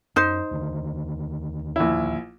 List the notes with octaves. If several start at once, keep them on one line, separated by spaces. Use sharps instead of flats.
F#2 D#4 C5
D#2 D3 D#3
A#1 E4